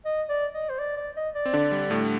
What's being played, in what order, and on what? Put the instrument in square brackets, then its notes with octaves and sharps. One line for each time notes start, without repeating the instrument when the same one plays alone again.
[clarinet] D#5
D5
D#5
C5
D5
D5
D#5
D5
[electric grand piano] C4
D3 D4
G3
A2 A3